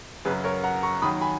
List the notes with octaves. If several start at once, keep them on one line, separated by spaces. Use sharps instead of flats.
F#2 C#3 F#3 G#4 B4
A#4 C#5
F#5 A#5
A#5 C#6
D#2 D#3 F#3 B5 D#6
G#5 B5